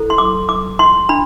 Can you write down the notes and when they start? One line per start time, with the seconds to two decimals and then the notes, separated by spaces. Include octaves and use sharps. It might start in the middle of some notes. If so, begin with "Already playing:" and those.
Already playing: E4 A4 C5
0.10 C6
0.18 D6
0.49 D6
0.79 C6
1.09 D4 B5